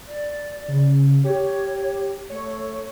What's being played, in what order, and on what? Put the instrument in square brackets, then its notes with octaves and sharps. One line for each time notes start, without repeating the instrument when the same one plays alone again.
[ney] D5
[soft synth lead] C#3
[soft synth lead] G4 [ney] C#5
[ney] A3 [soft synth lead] C#5